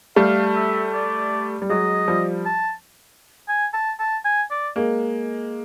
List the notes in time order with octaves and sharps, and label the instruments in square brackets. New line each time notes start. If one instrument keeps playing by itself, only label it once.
[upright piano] G3 A3 [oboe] F5
[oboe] E5
D5
[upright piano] G3
[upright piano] F#3 G#3 [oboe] D#5
[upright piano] F3 G3
[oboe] A5
G#5
A5
A5
G#5
D5
[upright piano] G#3 A#3